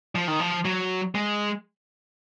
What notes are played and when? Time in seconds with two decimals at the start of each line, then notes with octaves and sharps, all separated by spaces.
0.15 F3
0.28 D#3
0.40 F3
0.65 F#3
1.15 G#3